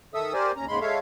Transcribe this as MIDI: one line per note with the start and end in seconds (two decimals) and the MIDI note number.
0.14 0.33 51
0.14 0.33 69
0.14 0.33 76
0.14 0.33 87
0.14 0.33 88
0.33 0.52 67
0.33 0.52 70
0.33 0.52 72
0.33 0.52 74
0.33 0.52 80
0.56 0.66 39
0.56 0.66 61
0.56 0.66 82
0.68 0.79 39
0.68 0.79 44
0.68 0.79 49
0.68 0.79 56
0.68 0.79 83
0.68 0.79 84
0.81 0.99 56
0.81 0.99 69
0.81 0.99 73
0.81 0.99 76
0.81 0.99 77